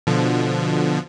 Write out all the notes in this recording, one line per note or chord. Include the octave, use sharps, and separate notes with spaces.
B2 D3 F3